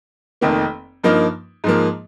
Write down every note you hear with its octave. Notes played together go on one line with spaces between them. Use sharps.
F1 F2 D#3 A#3
G2 F3 A#3 D#4
G#2 F3 A#3